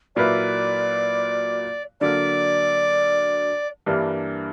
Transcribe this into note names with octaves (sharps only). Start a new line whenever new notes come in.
A#2 F#3 A#3 E4 B4 D5
D3 F#3 A#3 D5
G2 E3 G3 A#3 D4